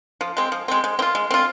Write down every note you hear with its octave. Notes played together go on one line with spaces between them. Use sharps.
F3
G#3 C4
F3
G#3 C4
G#3
C4
F4
G#3
C4 F4